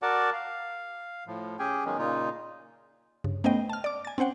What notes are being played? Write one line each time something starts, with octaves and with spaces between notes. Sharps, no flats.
F#4 A#4 D5 F#5 A5 D6
F5
A2 F3
C#4 G4 G#4 G5 G#5
D#3 F#3 G#3 B3 C#4
A#2 C#3 A#3 D#4 F4
G2 C#3
A3 B3 C#4 C5 D#5 G5
A5 F6
D5 D6
G#5 A6
C4 C#4 C5 F#5 G5